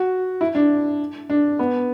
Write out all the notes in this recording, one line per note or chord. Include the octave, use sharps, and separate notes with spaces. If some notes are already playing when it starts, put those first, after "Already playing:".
Already playing: F#4
E4
D4
D4
B3